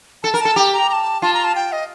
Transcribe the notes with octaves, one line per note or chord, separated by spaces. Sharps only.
A4 A5
A#4
A5
A4
G4 A#5
A#5
A#5
A5
F4 A5
A#5
A5
G5
D#5